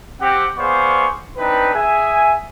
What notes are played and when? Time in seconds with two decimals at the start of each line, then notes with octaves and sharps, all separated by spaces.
0.20 C4 G4 F#5
0.58 B3 G#4 C5 D5 F5 C#6
1.37 C4 D4 D#4 B4
1.74 G#4 E5 G#5